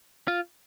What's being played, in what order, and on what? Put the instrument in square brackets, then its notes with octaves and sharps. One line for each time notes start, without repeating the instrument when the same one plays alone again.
[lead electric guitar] F4